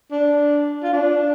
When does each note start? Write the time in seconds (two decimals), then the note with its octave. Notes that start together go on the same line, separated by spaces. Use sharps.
0.11 D4
0.83 F4
0.93 D4